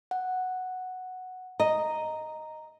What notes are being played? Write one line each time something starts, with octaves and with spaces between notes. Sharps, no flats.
F#5
D#5 A#5